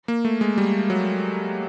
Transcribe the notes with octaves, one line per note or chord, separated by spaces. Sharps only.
A#3
A3
G#3
G3
F#3